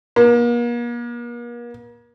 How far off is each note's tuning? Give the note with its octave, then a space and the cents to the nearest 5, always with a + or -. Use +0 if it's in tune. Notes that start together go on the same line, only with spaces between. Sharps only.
A#3 +40